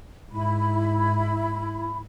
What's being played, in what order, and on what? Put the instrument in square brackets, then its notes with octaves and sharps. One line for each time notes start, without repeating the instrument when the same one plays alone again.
[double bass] G#2 [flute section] E4 B5